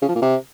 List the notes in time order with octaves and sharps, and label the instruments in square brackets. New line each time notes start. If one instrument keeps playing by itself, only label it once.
[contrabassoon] C#3
F3
A#2
C3